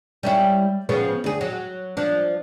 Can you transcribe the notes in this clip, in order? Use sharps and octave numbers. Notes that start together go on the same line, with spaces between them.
G3 C#4 E4
C#3 F3 B3
D2 G#4
F#3
F3 D4